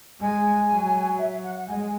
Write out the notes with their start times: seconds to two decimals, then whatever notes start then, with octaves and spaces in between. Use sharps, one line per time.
0.21 G#3 G#5
0.70 F#3
1.19 E5
1.44 F#5
1.55 F#5
1.67 G#3 G#5